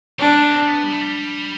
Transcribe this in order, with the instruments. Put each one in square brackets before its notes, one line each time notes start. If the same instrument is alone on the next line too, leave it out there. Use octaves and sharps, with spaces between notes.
[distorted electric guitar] G3 [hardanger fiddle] D4
[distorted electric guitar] A3
C4
C4
B3
G3
A3
G3